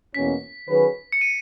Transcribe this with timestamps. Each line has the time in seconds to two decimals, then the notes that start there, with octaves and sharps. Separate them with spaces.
0.14 E2 B2 A#3 C#4 B6
0.68 D#3 F#3 C#4 G#4 B4
1.12 C#7
1.21 D#7